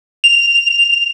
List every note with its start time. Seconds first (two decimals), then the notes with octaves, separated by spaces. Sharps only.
0.24 F7